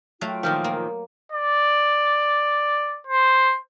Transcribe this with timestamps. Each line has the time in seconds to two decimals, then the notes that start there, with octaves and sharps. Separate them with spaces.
0.21 F#3 A3 F4 F5 G5
0.43 A#2 D#3 F3
0.64 A#3
1.32 D5
3.07 C5